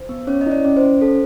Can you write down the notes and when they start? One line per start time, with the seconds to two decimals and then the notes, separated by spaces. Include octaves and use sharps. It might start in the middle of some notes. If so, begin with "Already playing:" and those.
Already playing: C5
0.09 B3
0.27 C#4 C#5
0.41 D#5
0.46 E4
0.52 D5
0.65 C#4
0.77 C5
0.82 C#4
1.01 A4